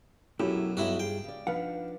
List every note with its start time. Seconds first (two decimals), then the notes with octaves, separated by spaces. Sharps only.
0.40 F#2 B2 F#3 A3 E4 G4
0.77 B1 G2 E4 F#4 G4
1.00 F4 G#4 G5
1.24 C#3 D5
1.47 F3 D4 D#4 B4 F5 F#5